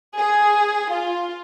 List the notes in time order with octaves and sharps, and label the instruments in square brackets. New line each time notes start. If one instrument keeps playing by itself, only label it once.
[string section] G#4
F4